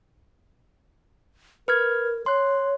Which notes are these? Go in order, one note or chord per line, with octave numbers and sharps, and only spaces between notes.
A#4 B4 F6 G#6
C#5 C6 F#6